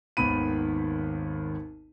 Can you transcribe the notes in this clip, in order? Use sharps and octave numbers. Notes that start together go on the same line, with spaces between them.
G#1 D#2 D#3 B3 B5 D#7